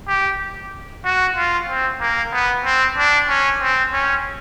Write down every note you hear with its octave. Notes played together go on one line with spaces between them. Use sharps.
G4
F#4
F4
C4
A#3
B3
C4
D4
C#4
C4
C#4